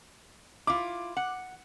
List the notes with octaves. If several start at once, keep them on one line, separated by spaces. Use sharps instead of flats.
E4 F4 D6
F#5